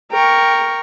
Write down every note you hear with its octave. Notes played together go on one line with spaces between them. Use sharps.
A#4 G5 C#6